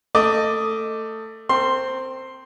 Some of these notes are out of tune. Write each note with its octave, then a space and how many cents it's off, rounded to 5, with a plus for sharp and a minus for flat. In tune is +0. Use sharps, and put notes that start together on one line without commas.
A3 +15 D#5 +0 D6 +0
C4 +0 A#4 -40 C6 +5